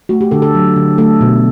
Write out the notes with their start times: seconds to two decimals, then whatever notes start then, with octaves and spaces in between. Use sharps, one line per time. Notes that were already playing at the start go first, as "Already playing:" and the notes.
0.09 A3 F#4
0.21 G4
0.31 D3 A4
0.42 A4
0.54 F#3
0.76 D3
0.98 A3 A4
1.21 B2